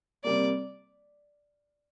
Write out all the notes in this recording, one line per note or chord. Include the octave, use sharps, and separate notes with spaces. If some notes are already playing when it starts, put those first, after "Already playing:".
C3 G3 A#3 D5